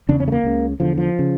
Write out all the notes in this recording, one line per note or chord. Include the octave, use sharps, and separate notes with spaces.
E2 C#3 D4
C#4
A3
A#3
C#2 C#3
E2 D3 F3
F3
C#3